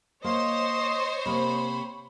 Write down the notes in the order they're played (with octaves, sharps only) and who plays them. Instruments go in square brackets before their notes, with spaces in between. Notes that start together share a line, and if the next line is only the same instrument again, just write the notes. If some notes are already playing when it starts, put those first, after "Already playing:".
[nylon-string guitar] A#3 [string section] C5 C#5 [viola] D#5 [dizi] C6
[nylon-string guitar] C3 A#3 [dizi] B5